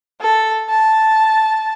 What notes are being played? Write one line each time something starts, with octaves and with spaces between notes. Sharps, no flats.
A4
A5